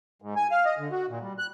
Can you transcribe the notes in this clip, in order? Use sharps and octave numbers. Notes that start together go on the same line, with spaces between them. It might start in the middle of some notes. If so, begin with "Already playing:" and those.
G#2
G#5
F5
D#5
D3
F#4
A#2
G3
F#6